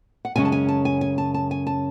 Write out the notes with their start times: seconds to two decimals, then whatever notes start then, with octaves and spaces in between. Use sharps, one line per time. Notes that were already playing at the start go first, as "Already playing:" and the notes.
0.25 F#5
0.36 F#2 C#3 G#3 C#4 G#5
0.45 A5
0.52 G#5
0.69 A5
0.85 G#5
1.01 G#5
1.18 A5
1.34 A5
1.51 G#5
1.67 A5